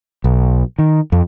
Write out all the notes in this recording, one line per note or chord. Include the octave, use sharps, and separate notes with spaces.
B1
D#3
F2